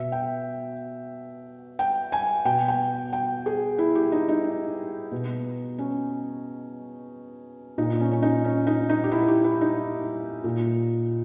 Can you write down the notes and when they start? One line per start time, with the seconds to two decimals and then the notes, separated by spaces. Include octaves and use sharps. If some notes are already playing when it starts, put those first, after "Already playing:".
Already playing: B2 E5
0.12 G5
1.79 G5
2.12 G#5
2.45 B2 G5
2.68 G5
3.13 G5
3.46 G#4
3.78 E4
3.95 G4
4.12 D#4
4.28 D#4
5.11 B2
5.78 C#4
7.78 A#2 D#4
8.00 C#4
8.11 C#4
8.22 D#4
8.45 C#4
8.67 D#4
8.89 D#4
9.04 G4
9.12 E4
9.22 E4
9.28 G4
9.44 E4
9.61 D#4
10.44 A#2